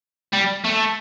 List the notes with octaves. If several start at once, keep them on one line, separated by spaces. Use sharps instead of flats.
G3
A3